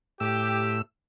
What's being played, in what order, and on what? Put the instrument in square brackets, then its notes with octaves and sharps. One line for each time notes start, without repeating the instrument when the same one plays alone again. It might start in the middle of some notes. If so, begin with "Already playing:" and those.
[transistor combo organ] A2 E6 [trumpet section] G4